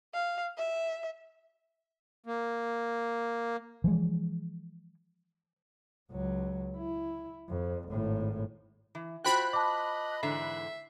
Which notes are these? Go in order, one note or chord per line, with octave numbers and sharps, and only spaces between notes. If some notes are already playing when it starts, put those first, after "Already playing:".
F5
E5
A#3
E3 F3 G#3
C#2 F#3
E4
F2
G#1 A2
E3
F4 F#4 C5 G5 B5 F#6
D#5 A5 D6
G#2 D3 E3 E5 C7